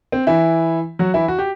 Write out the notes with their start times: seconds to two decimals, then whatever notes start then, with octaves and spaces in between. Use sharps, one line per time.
0.12 C4
0.27 E3 E4
0.99 F#3 F#4
1.14 E3 E4
1.28 F#4
1.39 G4